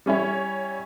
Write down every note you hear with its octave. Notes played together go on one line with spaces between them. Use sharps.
G3 C#4 E4 C#5